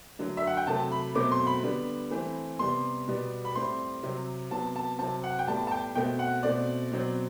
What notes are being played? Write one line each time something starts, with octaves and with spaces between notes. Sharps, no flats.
D3 F#3 A3
E5
F#5
G5
C3 F#3 A3 A5
B5
B2 F#3 A3 C4 D6
C6
B5
D3 G3 B3
E3 A3 C4
C3 G3 B3 C6
B2 G3 B3
B5
A2 G3 C4 C6
C3 F#3 C4
C3 F#3 B3 A5
A5
C3 F#3 C4 A5
F#5
G5
A2 G3 B3 A5
A5
G5
B2 A3 C4 G5
F#5
B2 A3 C4 D5
B2 F#3 C4